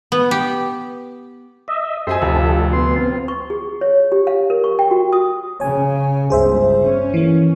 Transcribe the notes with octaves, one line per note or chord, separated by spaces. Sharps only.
B3
G4
D#5 E5
F#2 G4 A4 C5 D#5 E5 G#5 C6
F1 D2 F4 G4 A4
B3 C6
C4 F4
C#6
G#4
C#5
G4
F5
A#4
C#6
G5
F#4
D#6
C#3 C#5 G#5
G1 C#2 G#4 C5 E5
C#4
E3 A#3